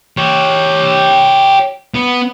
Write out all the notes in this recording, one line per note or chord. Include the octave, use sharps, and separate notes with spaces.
G4 C#5
B3